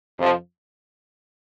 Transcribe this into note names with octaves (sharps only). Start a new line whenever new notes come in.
F2 C3 F3